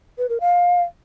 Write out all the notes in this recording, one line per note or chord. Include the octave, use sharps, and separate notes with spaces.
B4
A#4
F5